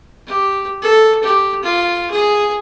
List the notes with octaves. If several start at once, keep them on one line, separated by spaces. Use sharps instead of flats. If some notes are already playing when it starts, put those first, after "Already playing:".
G4
A4
G4
F4
G#4